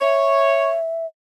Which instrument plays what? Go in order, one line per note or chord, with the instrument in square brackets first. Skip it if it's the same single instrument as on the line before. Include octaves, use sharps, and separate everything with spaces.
[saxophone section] C#5 [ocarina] E5